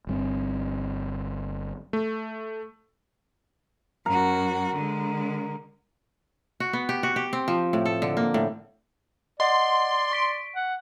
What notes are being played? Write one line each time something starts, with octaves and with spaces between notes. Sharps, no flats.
G1 G2 C4
A3
F#2 F#4 A#4
D3 G#3
F#4
B3
G4
F#4
G4
C4
F3
A2
A4
D3
A#3
A2
D5 D#5 F#5 C6
C#6 B6 D7
F#5